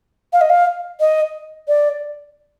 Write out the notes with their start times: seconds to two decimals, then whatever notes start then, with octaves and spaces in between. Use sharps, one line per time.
0.33 F5
0.41 D#5
0.50 F5
1.00 D#5
1.68 D5